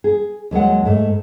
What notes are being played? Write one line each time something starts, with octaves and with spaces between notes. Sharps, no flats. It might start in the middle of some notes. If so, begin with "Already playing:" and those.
G#4
D#2 F#3 G#3 F#5
G#2 A3